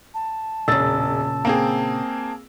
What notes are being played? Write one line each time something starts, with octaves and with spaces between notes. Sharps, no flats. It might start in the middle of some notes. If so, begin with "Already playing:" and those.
A5
E1 A#2 C#3 E6 A6
A#3 C4 G#4